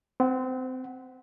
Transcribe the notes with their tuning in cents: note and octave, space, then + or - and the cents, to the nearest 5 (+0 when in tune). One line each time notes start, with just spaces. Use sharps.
C4 -25 F#5 +5